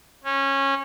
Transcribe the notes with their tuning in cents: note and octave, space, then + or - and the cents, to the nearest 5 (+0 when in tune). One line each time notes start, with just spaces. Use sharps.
C#4 -20